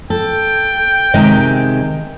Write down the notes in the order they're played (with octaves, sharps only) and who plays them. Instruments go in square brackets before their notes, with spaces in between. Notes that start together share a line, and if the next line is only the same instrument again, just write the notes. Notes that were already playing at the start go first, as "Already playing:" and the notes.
[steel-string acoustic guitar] A4 [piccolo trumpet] G5
[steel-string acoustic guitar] C3 D#3 G#3